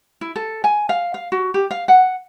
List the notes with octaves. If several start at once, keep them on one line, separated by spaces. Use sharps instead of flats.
E4
A4
G#5
F5
F5
F#4
G4
F5
F#5